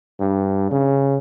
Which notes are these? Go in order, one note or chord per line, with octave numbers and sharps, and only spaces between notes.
G2
C#3